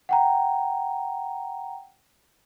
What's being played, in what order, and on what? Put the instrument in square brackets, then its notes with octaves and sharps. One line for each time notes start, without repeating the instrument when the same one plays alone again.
[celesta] F#5 G5 A#5